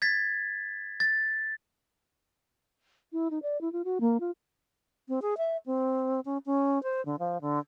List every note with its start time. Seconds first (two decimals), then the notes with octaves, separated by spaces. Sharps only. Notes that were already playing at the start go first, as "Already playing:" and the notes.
0.02 G#6 A6 B6
1.00 A6
3.13 E4
3.31 D#4
3.42 D5
3.61 E4
3.72 F4
3.84 F#4
4.00 A#3
4.20 F4
5.08 C4
5.22 G#4
5.38 E5
5.66 C4
6.25 C#4
6.46 C#4
6.83 C5
7.05 D3
7.19 F3
7.41 D3